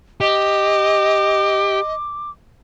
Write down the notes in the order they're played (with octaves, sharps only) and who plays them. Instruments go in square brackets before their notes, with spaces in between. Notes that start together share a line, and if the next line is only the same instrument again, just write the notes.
[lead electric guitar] G4 [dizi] D#5 [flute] D6